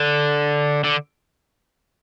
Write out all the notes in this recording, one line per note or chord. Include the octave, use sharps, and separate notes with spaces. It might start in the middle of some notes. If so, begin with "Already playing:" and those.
Already playing: D3
D3